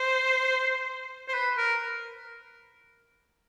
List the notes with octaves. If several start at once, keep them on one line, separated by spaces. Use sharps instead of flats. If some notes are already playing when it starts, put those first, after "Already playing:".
Already playing: C5
C5
B4
A#4